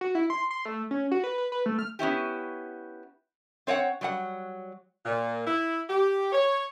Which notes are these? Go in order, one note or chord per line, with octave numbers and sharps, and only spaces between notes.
F#4
E4
C6
C6
A3
C#4
F#4
B4
B4
B4
A3
F6
B3 C#4 E4 G4
C4 C#5 D#5 F#5
F#3 G3 F#5
A#2
E4
G4
C#5